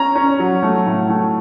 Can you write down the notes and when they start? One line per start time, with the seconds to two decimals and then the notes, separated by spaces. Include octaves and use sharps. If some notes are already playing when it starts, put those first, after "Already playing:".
Already playing: C#4 A#5
0.15 C#4
0.40 F#3
0.63 A3
0.87 A2
1.10 A3